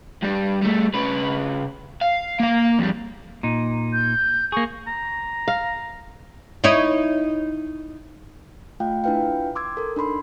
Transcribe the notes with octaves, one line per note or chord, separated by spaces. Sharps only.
G2 G3
G3 A3
C#3 B4
F5
A#3 F5
F2 G3
A#2 D#4
G6
A#3 G#4 C#6
A#5
F5
D#4 E4 C#5
A3 F4 F5 G5
D4 E4 F4 B4 F5 G5
C6 D6 E6 G#6
A4 A#4
D4 D#4 B5 C6